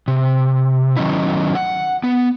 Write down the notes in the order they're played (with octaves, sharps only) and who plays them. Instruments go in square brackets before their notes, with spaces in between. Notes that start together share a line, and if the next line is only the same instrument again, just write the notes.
[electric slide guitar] C3
D#3 F#3 C#4 D#4 E4
F#5
B3